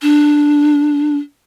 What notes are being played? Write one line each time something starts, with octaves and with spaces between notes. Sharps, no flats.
D4